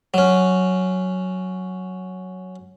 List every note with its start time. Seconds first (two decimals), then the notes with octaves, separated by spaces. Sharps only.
0.14 F#3 C#4